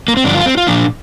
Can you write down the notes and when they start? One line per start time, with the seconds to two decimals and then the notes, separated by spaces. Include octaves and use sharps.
0.08 A#3
0.17 C4
0.24 G2 D3 F3 D4
0.35 F4
0.46 C4
0.57 F4
0.67 A#2 F3 A#3 D4